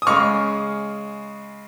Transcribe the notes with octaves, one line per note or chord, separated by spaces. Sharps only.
D#6
C#3 G#3 C#6 F6